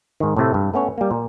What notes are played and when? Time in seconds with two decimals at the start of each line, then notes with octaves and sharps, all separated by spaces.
0.20 G#2 D#3
0.36 A2 C3 A3
0.54 G2
0.74 A3 B3 C#4 C#5
0.98 G3 A#3
1.11 A#2